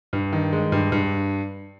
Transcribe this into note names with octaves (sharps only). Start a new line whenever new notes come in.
G2
D#3
G#3
G2
G2